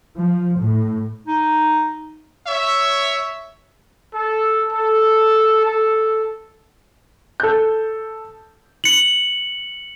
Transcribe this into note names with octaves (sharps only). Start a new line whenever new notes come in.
F3
A2
D#4
C#5 E5
A4
A4
A4
A4 G6
C#7 F#7